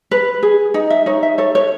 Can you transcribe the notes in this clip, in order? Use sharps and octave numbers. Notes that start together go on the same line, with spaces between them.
B4
G#4
D#4
E5
D#4 C#5
E5
A4 C#5
C#5